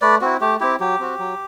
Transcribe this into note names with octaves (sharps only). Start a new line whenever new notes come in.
A3 B4 D5
C4 E4 F#4
A3 G4
C4 E4 G4
F#3 G4
C4 F#4
F#3